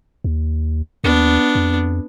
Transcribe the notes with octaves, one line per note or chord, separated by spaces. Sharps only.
D#2
D#2 B3 D4
F2